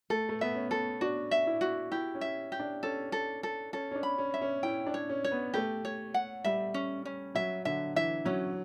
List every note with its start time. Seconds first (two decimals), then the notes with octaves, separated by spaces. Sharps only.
0.10 A3 A4
0.29 A3
0.41 B3 E5
0.55 C#4
0.71 A4
1.01 D4 F#4
1.31 E5
1.47 E4
1.61 F#4
1.91 E4 G4
2.15 C#4
2.21 E5
2.52 G4
2.59 D4
2.83 C#4 A4
3.12 A4
3.43 A4
3.73 C#4 A4
3.91 C#4
3.95 D4
4.03 B5
4.18 C#4
4.34 E5
4.42 C#4
4.63 E4 G5
4.86 D4
4.94 C#5
5.09 C#4
5.24 C#5
5.32 B3
5.54 A3 G4
5.85 C#5
6.14 F#5
6.44 G3 E5
6.74 C#4
7.05 C#4
7.35 F#3 E5
7.65 D3 E5
7.96 E3 E5
8.25 F#3 C#4